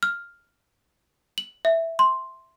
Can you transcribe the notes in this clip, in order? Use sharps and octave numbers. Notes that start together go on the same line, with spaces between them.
F6
F#7
E5
C6